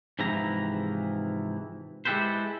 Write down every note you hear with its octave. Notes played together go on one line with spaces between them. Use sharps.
G#2 C3 E3 F3 E4 A#5
G#3 E4 G4 A4 B4 C5